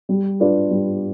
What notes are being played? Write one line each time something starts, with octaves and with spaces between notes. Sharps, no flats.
G3
D4 F4 B4 D5
G3